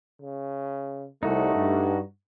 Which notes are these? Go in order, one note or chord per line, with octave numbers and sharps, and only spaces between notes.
C#3
C2 A3 D#4 F#4
G2